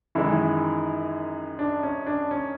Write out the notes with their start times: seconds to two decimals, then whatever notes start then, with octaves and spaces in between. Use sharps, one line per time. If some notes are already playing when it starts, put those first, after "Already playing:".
0.15 F#2 D#3 E3 G#3 E4
1.59 D4
1.83 C#4
2.06 D4
2.31 C#4